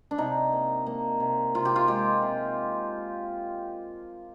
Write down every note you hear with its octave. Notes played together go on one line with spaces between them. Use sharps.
D4
C3 D#4
A#3
A#3
C3
C3 F4
G4
F4
G#3 G4
C3